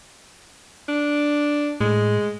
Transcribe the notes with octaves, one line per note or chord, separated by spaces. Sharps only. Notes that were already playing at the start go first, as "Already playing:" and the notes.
D4
A2 G#3